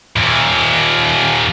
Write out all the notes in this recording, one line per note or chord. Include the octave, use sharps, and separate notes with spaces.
D#2 A#2